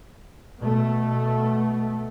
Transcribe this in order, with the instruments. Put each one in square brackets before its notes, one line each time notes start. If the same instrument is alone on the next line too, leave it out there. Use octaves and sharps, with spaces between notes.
[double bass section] B2 A3